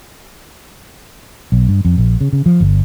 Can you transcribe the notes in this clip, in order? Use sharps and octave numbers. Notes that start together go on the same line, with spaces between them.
B1
G2
F2
A#1
C#3
C#3
F3
G1